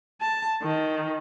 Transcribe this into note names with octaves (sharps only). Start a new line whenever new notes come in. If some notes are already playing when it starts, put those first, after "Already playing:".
A5
D#3